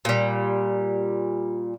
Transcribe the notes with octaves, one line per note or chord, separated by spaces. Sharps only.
A#2 G3